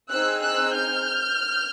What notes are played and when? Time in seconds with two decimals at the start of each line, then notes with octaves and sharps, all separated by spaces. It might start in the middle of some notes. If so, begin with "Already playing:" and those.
0.10 C4 D#4 G#4 E6 F#6
0.42 E6 F#6
0.74 F6 G6